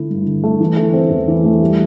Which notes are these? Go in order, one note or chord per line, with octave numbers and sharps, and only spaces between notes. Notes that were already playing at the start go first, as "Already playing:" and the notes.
Already playing: D3 A3 E4
G2
D3
A3
E3
A3
C4
E2
E3
A3
G3